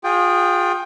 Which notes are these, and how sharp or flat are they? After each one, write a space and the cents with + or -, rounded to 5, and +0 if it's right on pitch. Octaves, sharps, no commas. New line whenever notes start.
F4 +30 G#4 -15 G5 +0